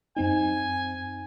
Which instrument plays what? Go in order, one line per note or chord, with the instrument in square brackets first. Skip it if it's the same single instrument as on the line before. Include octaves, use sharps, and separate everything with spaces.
[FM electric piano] F#2 C4 D#4 [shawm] G#5